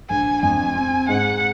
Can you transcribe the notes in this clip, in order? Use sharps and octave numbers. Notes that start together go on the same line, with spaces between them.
A#1 G#5
F2 G#5
C4
G#2 F#5